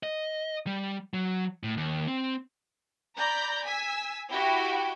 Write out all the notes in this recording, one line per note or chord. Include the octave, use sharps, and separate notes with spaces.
D#5
G3
F#3
A2
D#2
C4
D5 A#5 B5 G6
G#5 E6 B6
E4 F#4 G4 G5 D7